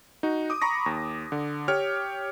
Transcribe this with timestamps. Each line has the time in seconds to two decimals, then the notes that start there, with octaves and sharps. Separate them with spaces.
0.23 D#4 F#4
0.50 D6 D#6
0.62 A#5 B5 C#6 A#6
0.86 D#2
1.32 D3
1.68 G4 C#5 G5 F6